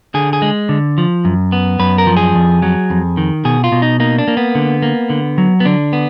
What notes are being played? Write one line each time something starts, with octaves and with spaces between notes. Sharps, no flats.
D3 G#4
G#4
G#3
D3
F3
F#2
B3
F#2 B4
A#4
F3
G#4
F2
F#3
F2
D#3
B2 G#4
F4
B2
D#4
A#3 D#4
D4
A#3
B3
D3
A#3
D3
F#3
B3
D3 D4
B3